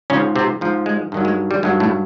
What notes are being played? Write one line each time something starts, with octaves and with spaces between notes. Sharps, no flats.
G#2 C#3 F3 C#4
C3 C4
G#2 F3
G#3
G2 D#3 F#3
G#3
G3
G2 D#3 F#3 G#3
A2 A3